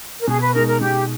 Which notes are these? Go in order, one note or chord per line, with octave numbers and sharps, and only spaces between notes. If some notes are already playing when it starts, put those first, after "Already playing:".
A#4
B2 G#4
B4
G#3 D#4 A#4
A#4
B2 G4